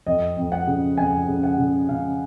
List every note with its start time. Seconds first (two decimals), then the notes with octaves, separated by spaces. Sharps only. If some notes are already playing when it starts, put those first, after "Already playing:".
0.06 F2 D#5
0.37 F2
0.52 F#5
0.67 C#3
0.97 F2 G#5
1.28 C#3
1.43 F#5
1.58 C#3
1.89 C#3 F5